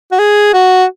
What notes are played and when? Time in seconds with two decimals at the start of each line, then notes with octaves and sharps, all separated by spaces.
0.12 F#4
0.19 G#4
0.53 F#4